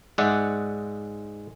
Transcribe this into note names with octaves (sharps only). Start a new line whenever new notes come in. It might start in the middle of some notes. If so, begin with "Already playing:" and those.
G#2 G#3 D5 E5 F#5